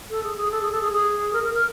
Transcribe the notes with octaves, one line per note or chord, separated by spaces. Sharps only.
A4
G#4
G#4
A4
G#4
A4
G#4
G#4
A#4
A#4
A#4